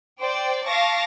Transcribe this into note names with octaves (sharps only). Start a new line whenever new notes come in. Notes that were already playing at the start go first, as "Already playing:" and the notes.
C5 D5 G5
F5 A5 C#6 D6 A#6